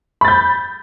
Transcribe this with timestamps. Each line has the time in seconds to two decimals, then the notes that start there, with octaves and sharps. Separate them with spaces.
0.21 B5
0.25 A6
0.28 G6